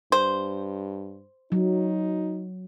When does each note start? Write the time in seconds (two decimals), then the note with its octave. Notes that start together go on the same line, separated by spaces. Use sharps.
0.12 G2 C5
1.52 F#3 D#4